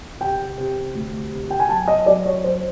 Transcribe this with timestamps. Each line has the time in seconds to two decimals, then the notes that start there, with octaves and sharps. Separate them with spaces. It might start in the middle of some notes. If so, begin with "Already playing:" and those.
0.21 C3 G5
0.58 C3
0.95 D2
1.32 C3
1.50 G5
1.59 G#5
1.69 F#3 A5
1.88 D#5
2.06 F#3 D5
2.26 C#5
2.44 F#3 C5